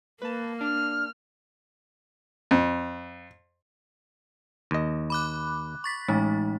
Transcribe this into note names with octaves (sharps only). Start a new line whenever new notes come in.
A#3 B4 A5
D4 F6
F2
D#2 D#5
B5 D6 F#6
C#6 A6 B6
A1 G#3 D#4